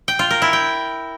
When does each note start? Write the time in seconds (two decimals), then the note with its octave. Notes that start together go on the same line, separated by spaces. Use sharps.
0.08 G5
0.19 F4
0.30 A#4
0.42 E4
0.53 G5